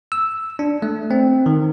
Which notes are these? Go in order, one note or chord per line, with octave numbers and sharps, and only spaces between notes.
E6
D4
A3
C4
D#3